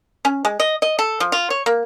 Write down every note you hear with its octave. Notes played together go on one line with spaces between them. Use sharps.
C#4
G#3
D#5
D#5
A4
F3
F4
C#5
A#3